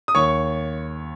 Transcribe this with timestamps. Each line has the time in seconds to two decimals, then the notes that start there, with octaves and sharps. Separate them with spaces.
0.08 D#6
0.15 D#2 C#5 C#6